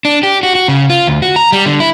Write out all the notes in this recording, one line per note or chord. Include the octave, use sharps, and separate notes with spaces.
D4
G4
F#4
F#4
C#3
F4
D2
F#4
A#5
G3
D3
E4